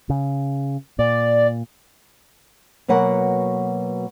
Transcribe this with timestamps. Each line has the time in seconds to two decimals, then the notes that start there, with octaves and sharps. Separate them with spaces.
0.10 C#3
0.99 A#2 D5
2.88 B2 F#3 A#3 B4 F#5